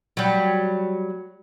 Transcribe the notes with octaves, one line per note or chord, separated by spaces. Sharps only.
F#3 G3